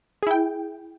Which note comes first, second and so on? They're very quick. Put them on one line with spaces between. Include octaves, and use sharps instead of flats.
G#4 E4 G5